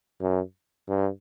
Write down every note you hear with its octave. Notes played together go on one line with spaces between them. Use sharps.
F#2
G2